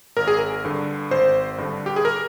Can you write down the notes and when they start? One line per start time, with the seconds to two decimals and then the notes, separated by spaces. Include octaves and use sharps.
0.17 G#1 A#4
0.27 G#4
0.39 A#4
0.65 G2 D3
1.11 G#1 C5
1.58 G2 D3
1.86 G4
1.96 G#4
2.05 A#4